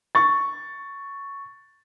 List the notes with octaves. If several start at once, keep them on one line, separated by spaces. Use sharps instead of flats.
C#6 A6